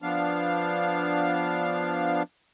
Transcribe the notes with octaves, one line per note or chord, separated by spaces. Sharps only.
F3 B3 D4 F5